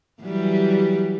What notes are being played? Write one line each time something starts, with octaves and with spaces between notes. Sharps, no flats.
E3 F#3 G3